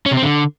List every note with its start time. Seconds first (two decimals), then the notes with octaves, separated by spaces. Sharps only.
0.06 C#4
0.11 C3
0.17 C4
0.22 D3